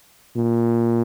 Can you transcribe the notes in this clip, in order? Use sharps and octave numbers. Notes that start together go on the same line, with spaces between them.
A#2